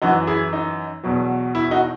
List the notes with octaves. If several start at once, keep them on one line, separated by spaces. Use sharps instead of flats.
F#2 E3 D#4 F#4
E4 G#4
D#4
E2 B2 F#3
E4
D#4 F#4